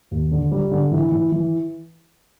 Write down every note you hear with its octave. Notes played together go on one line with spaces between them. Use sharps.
D#2
D3
G3
D3
E3
E3
E3